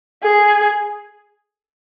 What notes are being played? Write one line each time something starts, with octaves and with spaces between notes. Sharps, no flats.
G#4